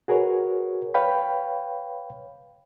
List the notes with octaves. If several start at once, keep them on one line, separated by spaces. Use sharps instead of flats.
F#4 G#4 A#4 B4 C#5
B4 C#5 F5 G5 B5